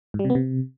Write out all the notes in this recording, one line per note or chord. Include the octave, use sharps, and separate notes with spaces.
G#2
G3
C3
B3
C3